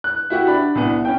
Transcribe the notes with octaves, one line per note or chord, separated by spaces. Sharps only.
F#6
E4 F#4 G4
D4 B5
C2 B3
C#4 G5